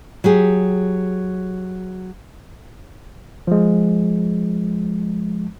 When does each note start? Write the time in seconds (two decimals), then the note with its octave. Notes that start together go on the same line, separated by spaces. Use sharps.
0.24 F#3 G4 G#4
3.47 F3 G#3